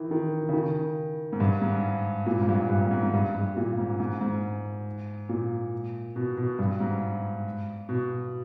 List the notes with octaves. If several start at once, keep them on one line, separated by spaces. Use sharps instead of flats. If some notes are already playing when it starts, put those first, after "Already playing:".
Already playing: D#3 E3
D#3
C#3
D#3
G#2
G2
G#2
A#2
G#2
G2
G2
G#2
G#2
G#2
G2
G2
A#2
G#2
G#2
G#2
A#2
B2
B2
G2
G#2
B2